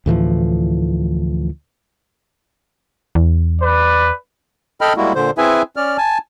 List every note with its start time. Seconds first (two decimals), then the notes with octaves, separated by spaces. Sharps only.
0.06 D2 A2 E3 F3
3.15 E2
3.62 B4 D5
4.81 A4 D#5 G5 B5 F6
4.97 G3 G#3 A#3 E4 F#4
5.15 A#2 D3 C5
5.38 C4 E4 G#4 B4 E5 G#5
5.76 C#4 D5 F6
5.98 G#5 A5